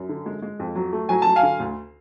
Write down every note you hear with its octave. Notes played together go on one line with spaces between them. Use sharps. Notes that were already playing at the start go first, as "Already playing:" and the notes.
Already playing: F#2
D3
G#3
G#3
F2
F#3
A3
F#3 G#5
F#3 A5
F5 G#5
D3
D2